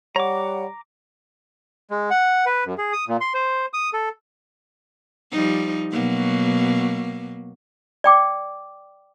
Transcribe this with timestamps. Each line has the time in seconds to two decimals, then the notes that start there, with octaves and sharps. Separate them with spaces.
0.16 G3 C#5 F#5 A#5 D6
1.91 G#3
2.10 F#5
2.46 B4
2.65 F#2
2.78 G#4
2.93 D#6
3.08 A#2
3.21 C6
3.34 C5
3.73 D#6
3.93 A4
5.31 F3 G3 D#4
5.92 B2 F#3 A#3
8.04 D5 G5 D6